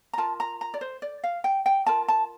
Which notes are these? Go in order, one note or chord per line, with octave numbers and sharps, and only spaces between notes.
A#5
F4 A#4 A5
A#5
A#5
D5
C5
D5
F5
G5
G5
F4 A#4 A5
A5